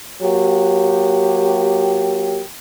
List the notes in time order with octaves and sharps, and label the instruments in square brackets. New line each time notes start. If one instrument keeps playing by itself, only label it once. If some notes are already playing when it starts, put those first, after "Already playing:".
[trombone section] F#3 A#3 G4